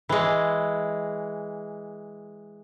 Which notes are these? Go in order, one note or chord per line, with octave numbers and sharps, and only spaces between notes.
E3 G#3